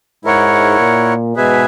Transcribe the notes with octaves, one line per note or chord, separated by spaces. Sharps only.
G#2 E4 A#4 C#5 F#5
A#2
G#2 B2 G#4 B4 E5 G#5